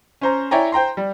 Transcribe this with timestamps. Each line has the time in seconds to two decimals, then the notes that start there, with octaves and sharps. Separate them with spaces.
0.21 C#4 C5 A#5
0.51 E4 C#5 D5 G5 G#5 A#5
0.72 C5 G5 A#5 C6
0.97 G3